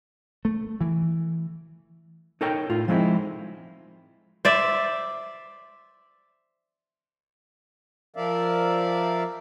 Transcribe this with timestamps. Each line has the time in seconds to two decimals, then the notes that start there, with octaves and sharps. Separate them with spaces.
0.45 A3
0.81 E3
2.41 D#4 A4 A#4 C#5 G5
2.69 A2 F4
2.88 F3 G#3 C4 D#4 E4
4.45 C5 D5 E5
8.16 F3 A#4 D5 E5 F5